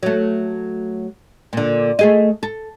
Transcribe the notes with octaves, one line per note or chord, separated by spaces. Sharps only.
F#3 A3
A#2 D3
A3 G#4 D#5
A4